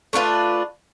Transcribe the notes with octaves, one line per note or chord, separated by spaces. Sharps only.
A3 D4 F4 B4